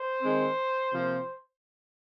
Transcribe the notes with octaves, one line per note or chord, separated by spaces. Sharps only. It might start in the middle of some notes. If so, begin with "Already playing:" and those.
Already playing: C5
D#3 G#3 C4
C3 F3 A#3